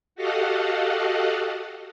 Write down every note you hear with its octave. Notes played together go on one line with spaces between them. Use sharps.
F#4 G4 A4 D#5 F5 F#5